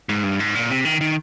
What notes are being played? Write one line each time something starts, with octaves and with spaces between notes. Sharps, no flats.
G#2
G2
G#2
A#2
C3
D#3
D#3